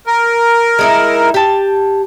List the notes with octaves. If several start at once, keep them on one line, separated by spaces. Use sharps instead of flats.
A#4
G#3 D#4 E4
G4 A5